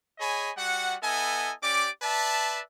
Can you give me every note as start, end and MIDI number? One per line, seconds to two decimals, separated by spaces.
0.19 0.50 68
0.19 0.50 73
0.19 0.50 75
0.19 0.50 80
0.19 0.50 83
0.57 0.95 55
0.57 0.95 66
0.57 0.95 78
1.02 1.53 59
1.02 1.53 64
1.02 1.53 69
1.02 1.53 75
1.02 1.53 80
1.62 1.87 61
1.62 1.87 67
1.62 1.87 74
1.62 1.87 86
2.02 2.60 71
2.02 2.60 74
2.02 2.60 76
2.02 2.60 81